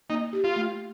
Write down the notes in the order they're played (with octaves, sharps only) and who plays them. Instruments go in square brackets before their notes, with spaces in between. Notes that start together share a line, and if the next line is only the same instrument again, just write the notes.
[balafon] A#3 [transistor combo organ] D#4
[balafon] G4
[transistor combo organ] F4
[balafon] A3